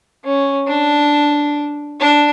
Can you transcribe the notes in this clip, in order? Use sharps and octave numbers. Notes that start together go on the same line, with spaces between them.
C#4
D4
D4